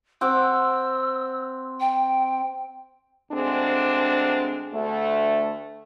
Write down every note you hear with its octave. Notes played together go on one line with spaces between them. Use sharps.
C4 F#5 D6 E6
G5
D2 G#3 C4 D4
D2 A3